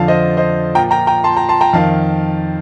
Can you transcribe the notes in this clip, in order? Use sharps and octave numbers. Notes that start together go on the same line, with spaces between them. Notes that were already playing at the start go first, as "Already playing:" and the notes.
Already playing: F2 D3 F3 F5 A5
C5 D#5
C5 D#5
A#2 F3 G5 A#5
G5 A#5
G5 A#5
A5 C6
G5 A#5
A5 C6
G5 A#5
F2 D#3 F5 A5